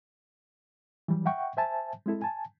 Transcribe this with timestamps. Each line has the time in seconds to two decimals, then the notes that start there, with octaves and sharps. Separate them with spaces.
1.08 E3 F#3 G3
1.26 E5 F#5 G5 C#6
1.57 C5 E5 G#5 A5
2.06 G#3 C4 E4 A4
2.22 G#5 A5